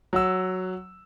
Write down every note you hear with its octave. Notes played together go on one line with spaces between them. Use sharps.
F#3 F#5 E6